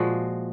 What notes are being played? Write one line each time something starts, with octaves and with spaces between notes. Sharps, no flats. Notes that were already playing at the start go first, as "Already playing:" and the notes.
Already playing: A#2 F3 G#3 F#4